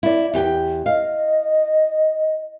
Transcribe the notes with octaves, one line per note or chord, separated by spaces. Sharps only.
E4 D5
E2 G4 G5
D#5 F5